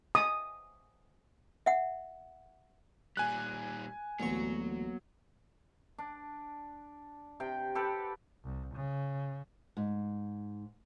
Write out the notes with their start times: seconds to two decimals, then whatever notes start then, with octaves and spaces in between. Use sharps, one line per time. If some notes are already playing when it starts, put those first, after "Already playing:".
0.15 D#6
1.66 E5 F#5
3.17 A#2 G3 G#5 F#6
4.20 A1 D2 F#3 A#3 B3 C#6
5.98 D4
7.40 C3 G5
7.75 G4 A4 B4 F#5
8.44 C2
8.75 C#3
9.77 G#2